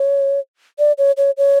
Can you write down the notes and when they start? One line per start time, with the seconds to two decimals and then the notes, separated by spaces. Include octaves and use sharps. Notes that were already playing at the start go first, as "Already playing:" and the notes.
Already playing: C#5
0.79 D5
0.98 C#5
1.17 C#5
1.38 C#5